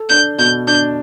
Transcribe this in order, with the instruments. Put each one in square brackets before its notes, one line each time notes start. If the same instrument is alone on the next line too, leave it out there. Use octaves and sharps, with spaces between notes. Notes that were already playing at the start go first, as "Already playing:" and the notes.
Already playing: [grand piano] A4
[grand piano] D4 [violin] G6
[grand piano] B2 [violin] G6
[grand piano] D4 [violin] G6